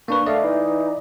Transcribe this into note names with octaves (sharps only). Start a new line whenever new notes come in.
A#3 D4 B4 C#6
A3 D5 D#5 F5
E3 D#4